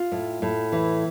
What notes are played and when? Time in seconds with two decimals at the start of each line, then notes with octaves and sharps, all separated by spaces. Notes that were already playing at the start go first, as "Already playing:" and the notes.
Already playing: F4
0.12 A2
0.42 A2
0.72 E3